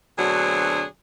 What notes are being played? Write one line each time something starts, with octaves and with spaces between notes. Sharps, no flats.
D2 B2 F#3 C4 D4 G#4